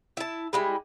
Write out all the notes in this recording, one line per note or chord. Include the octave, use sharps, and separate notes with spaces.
E4 A5
G3 G#3 E4